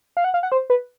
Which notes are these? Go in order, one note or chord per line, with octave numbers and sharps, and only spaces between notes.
F5
F#5
F5
F#5
C5
B4